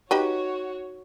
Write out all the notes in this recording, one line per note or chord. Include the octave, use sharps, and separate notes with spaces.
D#4 F#4 G4 B4 C#5